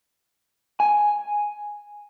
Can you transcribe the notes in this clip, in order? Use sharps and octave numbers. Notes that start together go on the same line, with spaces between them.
G#5